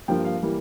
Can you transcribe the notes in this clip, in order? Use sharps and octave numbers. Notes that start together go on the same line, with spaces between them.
G2 F3 A#3 G5
F5
E3 G3 A#3